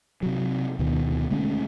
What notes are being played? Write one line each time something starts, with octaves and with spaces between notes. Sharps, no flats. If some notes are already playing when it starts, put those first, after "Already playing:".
C3 F#3
D2 B2 D#3
D3 G#3 A3 C#4